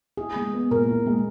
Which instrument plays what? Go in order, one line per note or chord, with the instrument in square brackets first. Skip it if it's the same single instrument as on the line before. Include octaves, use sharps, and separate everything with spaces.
[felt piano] E4 [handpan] G#4
[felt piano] G#3
B3
[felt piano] A#2 [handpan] A#4
[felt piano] E4
G#3